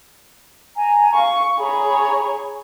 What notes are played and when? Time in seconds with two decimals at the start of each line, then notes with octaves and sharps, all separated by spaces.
0.75 G#5 A#5
1.14 F5 C#6
1.58 G#4 C#5 A#5 B5